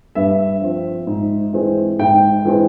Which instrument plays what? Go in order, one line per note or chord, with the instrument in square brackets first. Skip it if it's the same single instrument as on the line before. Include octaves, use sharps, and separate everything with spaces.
[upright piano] G2 E5
F3 C4
G#2
E3 G#3 C4
G#2 G5
E3 G#3 C4